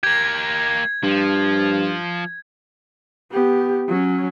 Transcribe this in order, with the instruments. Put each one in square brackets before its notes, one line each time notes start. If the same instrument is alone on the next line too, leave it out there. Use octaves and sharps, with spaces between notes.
[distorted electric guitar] A#3 G4 [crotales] G#6
[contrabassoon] G2 [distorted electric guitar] F3
[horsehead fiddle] B3 G4
F#3 C#4